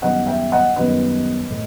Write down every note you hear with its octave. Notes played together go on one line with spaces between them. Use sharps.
F#2 D#3 G3 B3 D#5 F#5
E5 G5
D#5 F#5
F#2 D#3 G3 B3 B4 D#5
A2